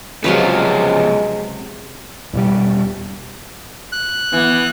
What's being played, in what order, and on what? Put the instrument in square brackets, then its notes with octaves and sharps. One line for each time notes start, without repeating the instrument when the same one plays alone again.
[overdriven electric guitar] C#2 F3 [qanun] C3 F#3 B4 [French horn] G#3
[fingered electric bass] E2 B2 G3
[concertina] F#6
[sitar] E3 [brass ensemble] B3